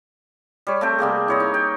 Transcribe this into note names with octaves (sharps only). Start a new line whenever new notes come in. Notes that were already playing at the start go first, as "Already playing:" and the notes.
G3 C#5
A3 C4 G5
C3 G3 A#3 G#4
E4 C#5 D#5
D#4
G5